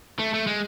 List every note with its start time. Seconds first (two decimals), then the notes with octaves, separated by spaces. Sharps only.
0.19 A3
0.34 A3
0.47 G#3